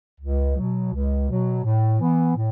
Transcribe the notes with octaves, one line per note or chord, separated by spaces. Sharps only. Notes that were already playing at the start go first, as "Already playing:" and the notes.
C#2
B2 F#3
C#2
B2 F#3
A2
E3 B3
A2